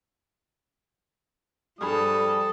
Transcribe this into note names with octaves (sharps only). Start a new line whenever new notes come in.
G2 F3 G3 G#4 A4 B5 D#6